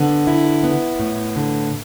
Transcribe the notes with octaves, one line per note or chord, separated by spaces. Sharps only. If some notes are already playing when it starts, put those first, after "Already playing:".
Already playing: D3 B3
E4
B3
A2
D3